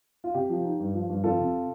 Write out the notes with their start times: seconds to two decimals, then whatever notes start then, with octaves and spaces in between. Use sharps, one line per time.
0.24 F4
0.34 C3 G4
0.49 F3
0.64 D#4
0.80 G2
0.94 F3
1.09 G2
1.24 F2 F4 A4
1.39 C3